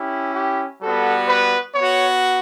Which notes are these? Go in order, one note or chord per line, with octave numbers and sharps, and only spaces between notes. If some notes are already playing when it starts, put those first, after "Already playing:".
Already playing: C#4 E4 G4
G4
G3 B3 F#4 A4
B4
B3 F#4 C#5